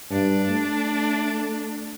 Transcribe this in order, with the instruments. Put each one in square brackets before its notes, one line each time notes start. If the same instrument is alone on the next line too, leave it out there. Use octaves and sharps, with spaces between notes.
[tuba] G2 [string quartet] D4
[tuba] A3